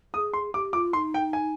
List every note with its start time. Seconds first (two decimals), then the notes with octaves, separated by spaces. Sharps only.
0.14 G#4 D#6
0.33 C6
0.54 G4 D6
0.73 F4 D6
0.93 D#4 C6
1.14 G5
1.33 G#5